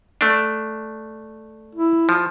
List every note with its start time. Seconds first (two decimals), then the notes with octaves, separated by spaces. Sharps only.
0.21 A3 D4
1.75 E4
2.09 F3